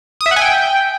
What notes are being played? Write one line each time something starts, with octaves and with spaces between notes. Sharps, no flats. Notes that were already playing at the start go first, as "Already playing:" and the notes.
D#6
E5
F#5
G#5
G5